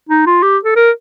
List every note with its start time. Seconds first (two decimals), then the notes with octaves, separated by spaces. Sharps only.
0.09 D#4
0.26 F4
0.43 G4
0.64 A4
0.76 A#4